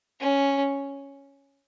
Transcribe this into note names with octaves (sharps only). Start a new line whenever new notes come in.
C#4